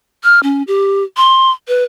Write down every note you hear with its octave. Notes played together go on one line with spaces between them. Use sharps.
F6
C#4
G4
C6
B4